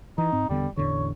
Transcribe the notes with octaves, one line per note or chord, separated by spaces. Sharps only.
E3 D#4
G#2 C4
E2 D3 G3 B3
A1 E2 D3 C#5